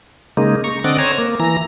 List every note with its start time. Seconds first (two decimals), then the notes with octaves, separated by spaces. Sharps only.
0.37 C#3 G#3 A#3 D#4
0.64 A#5 C#6
0.84 D3 C4 D#5 D6 F#6 A6
0.98 C5 C#5 G#5 A#5
1.18 A#3
1.40 E3 A#5